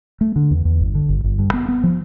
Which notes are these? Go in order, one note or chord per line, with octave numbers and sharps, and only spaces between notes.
A3
D3
E2
E2
G1
D3
G1
G1
G2
B3
B3
F3